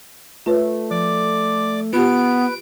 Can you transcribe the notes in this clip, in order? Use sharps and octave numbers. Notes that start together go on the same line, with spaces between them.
A3 F4 B4 C#5
F3 D5 D6
B3 F4 G4 B4 D7